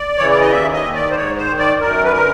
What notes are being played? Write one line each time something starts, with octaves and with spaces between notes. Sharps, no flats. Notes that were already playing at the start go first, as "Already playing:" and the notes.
Already playing: D5
C#3 E3 C#5
D5
D#5
D#2 E5
D#5
D#3
D5
C5
G#2 C#5
C5
D#3
D5
F#2 A#4
B4
D3 A#4